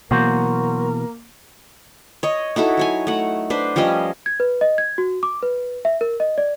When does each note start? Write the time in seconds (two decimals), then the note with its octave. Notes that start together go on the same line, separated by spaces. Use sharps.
0.11 B2 E3 F#3 A#3 F#4 A#4 C5
2.23 C#5 D#5
2.56 D#4 E4 F#4 A4
2.77 F#3 C#5 G#5
3.07 A3 F#5
3.50 D4 B4 C5
3.76 F3 G3 C#4 D#5
4.26 G#6
4.40 B4
4.61 D#5
4.78 G#6
4.98 F#4
5.23 D6
5.43 B4
5.85 E5
6.01 A#4
6.20 D#5
6.38 D5